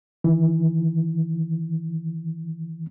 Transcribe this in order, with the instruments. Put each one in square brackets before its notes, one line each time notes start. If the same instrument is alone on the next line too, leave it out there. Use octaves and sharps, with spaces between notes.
[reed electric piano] D#3 E3